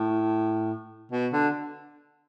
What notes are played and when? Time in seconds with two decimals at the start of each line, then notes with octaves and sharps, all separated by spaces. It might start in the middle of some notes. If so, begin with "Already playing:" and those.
Already playing: A2
1.12 B2
1.33 D3